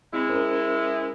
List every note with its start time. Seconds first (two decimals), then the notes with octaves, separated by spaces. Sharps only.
0.13 G#3 C4 E4
0.30 C#4 A#4 C5